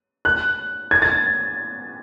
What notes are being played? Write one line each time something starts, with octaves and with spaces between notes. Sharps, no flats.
F#6
G#6
A6